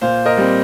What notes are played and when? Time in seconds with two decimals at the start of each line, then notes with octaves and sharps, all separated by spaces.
0.01 A#2 C5 F5
0.25 A#4 D#5
0.37 G3 C4